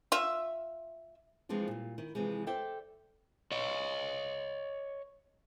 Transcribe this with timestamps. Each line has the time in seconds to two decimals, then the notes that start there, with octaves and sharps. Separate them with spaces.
0.12 F4 E5
1.49 E3 F3 G#3 C4 D4 F4
1.68 A#2 G3
1.98 D#3 E4
2.15 C3 E3 F3 G#3
2.47 A4 C5 D5 E5 G5
3.52 C#5 D#5